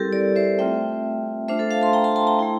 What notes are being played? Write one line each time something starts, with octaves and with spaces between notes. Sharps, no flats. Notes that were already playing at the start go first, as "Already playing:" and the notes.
Already playing: G3 C4 E4 G4 A4 A#4
A#4 D5
C5 E5
A3 C4 F4 E5 G5
A3 D4 F4 C5 E5
A4 C5
F5 A5
A5 C6
G5 A#5
A5 C6
A5 C6
G5 A#5
A3 E4